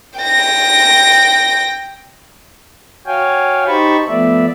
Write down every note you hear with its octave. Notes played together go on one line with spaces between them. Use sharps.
G5 A#6
F#4 C#5 F5 G5 G#5
D#4 G4 C5 A5 B5 C#6
F3 A3 B3 D5 E5